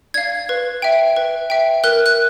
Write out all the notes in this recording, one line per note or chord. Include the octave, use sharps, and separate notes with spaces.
D5 F5 G#6
B4
E5 G5
B4
E5 G5
A#4 F#6
F#6